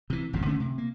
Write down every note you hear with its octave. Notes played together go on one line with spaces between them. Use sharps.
C3 E3
G#1 F2 A#2 C#3
D3 A3 C#4
C3
A#3